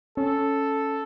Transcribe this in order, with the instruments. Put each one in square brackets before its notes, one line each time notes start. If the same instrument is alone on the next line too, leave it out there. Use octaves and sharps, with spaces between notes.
[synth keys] C#4 [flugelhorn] A4